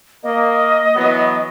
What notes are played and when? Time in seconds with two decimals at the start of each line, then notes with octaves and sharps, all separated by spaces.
0.23 A#3 D#5
0.95 E3 F#3 B3